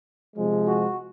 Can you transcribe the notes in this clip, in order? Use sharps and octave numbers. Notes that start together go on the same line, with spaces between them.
C3 F3 G#3
F#4